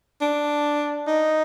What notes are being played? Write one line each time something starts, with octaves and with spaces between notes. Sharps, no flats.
D4
D#4